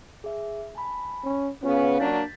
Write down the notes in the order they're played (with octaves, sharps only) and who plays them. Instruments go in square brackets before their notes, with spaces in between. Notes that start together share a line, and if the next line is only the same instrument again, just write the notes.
[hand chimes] G#4 E5
G#5 A5 B5
[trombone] C#4
[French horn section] C#3 B3 [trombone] C#4 [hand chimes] F4 F5
[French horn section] F#3 A#3 D4 [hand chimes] G6 A6 B6